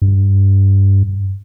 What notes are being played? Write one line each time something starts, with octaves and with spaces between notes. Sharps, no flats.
G2